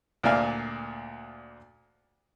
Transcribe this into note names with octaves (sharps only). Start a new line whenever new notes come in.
D2 A#2 D5 F5 G#5 F6